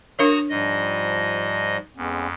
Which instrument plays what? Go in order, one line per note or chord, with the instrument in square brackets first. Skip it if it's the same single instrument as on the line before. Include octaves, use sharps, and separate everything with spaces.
[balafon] D4 A#4 C#5 [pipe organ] F#4 A#5 D#6
[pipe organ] G#2 D#5 [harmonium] F3 G3
[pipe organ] F2 [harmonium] G#3 B3 C#4